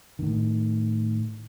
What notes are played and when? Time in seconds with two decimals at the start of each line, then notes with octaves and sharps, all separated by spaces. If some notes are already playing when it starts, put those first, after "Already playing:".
0.19 A2 D#3